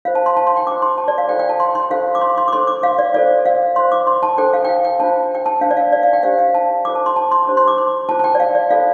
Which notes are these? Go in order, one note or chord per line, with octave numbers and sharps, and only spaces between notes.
F4 C5 F5
A5
C6
A5
C6
G5
D4 F4 C5 D6
C6
A5
D5
F5
F4 A4 C5 G5
G5
A5
C6
C6
D4 F4 A4 C5 F5
D6
C6
C6
D6
D4 A4 C5 C6
D6
F5
D5
F4 A4 C5 D5
F5
F4 C5 C6
D6
C6
A5
D4 A4 C5 G5
F5
G5
F5
G5
D4 F4 C5 A5
G5
A5
D4 F4 C5 F5
D5
F5
D5
F5
G5
D4 G4 C5 F5
F5
A5
F4 A4 C5 D6
A5
C6
A5
C6
D4 G4 C5
C6
D6
C6
F4 C5 A5
A5
G5
D5
F5
D5
F4 A4 C5 F5